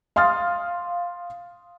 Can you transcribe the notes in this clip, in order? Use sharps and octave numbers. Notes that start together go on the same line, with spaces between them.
F5 C6 D#6 F6 A6